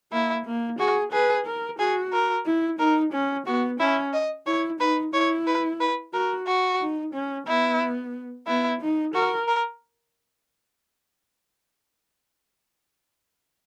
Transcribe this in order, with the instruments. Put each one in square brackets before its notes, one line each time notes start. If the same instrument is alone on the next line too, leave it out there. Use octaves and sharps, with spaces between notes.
[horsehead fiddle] A#3 [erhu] E4
[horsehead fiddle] A#3
[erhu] F#4 [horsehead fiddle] G#4
[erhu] G#4 [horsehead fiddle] B4
[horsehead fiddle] A#4
[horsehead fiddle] F#4 [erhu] G#4
[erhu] A#4
[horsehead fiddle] E4
[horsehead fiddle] D#4 [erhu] A#4
[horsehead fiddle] C#4
[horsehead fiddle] B3 [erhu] F#4
[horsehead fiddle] C#4 [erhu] E4
[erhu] D#5
[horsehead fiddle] E4 [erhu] C#5
[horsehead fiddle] D#4 [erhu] B4
[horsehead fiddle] E4 [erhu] C#5
[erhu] B4
B4
[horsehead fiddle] F#4 [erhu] A#4
[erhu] F#4
[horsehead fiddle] D#4
C#4
[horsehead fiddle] B3 [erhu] E4
[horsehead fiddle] B3 [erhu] E4
[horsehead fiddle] D#4
[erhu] F#4 [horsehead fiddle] A#4
[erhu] A#4